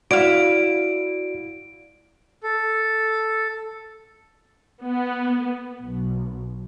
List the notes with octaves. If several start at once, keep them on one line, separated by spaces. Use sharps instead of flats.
E4 F#4 D5 F5 D7
A4
B3
B1